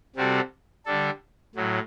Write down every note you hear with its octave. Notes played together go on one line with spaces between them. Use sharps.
C3 G3 C4 F#4 A4
D3 G3 D4 A4
A2 F#3